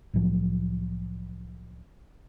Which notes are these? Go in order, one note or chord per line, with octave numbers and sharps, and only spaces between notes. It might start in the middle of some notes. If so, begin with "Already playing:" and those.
C2 A2 F3 F#3